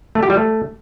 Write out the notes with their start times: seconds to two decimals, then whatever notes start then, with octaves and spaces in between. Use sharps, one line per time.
0.15 A3
0.23 G4
0.30 G3
0.37 A3